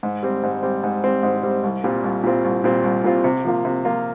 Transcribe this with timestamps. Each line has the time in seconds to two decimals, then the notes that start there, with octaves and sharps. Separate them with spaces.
0.03 G#2
0.23 G3 C4
0.43 G#2
0.63 G3 C4
0.83 G#2
1.04 G3 C4
1.23 G#2
1.43 G3 C4
1.63 C2
1.84 A#2 G3 C4 F4
2.04 C2
2.23 A#2 G3 C4 F4
2.44 C2
2.64 A#2 G3 C4 F4
2.84 C2
3.04 A#2 G3 C4 F4
3.24 C3
3.45 F3 A#3 F4
3.65 C3
3.85 F3 A#3 F4